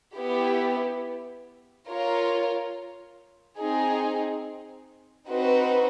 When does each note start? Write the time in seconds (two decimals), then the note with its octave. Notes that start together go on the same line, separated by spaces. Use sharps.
0.18 B3 E4 G4
1.88 F4 A#4 C#5
3.59 C4 D#4 G#4
5.29 C4 D#4 F#4 B4